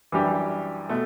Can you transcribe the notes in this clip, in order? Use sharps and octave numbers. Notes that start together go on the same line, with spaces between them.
F#2 E3 G3 D4 G4
B2 A3